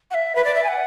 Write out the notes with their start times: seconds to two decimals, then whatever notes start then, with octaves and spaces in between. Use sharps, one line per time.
0.11 F#5
0.14 E5
0.35 B4
0.44 D5
0.55 E5
0.63 G#5
0.68 F#5